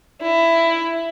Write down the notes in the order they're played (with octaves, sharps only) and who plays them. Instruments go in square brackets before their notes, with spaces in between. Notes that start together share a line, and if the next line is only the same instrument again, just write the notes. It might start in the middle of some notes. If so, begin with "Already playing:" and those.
[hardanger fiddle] E4